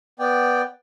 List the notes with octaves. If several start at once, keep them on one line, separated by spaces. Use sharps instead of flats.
B3 D5 G5